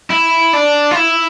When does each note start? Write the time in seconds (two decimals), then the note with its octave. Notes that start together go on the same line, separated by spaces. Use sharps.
0.10 E4
0.53 D4
0.91 F4
0.96 E4